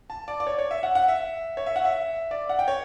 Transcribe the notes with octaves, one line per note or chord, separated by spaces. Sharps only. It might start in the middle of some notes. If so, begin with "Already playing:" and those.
A5
D5
D5
C#5
C#5
E5
F#5
F#5
E5
C#5
E5
F#5
E5
D5
F#5
G5
C#5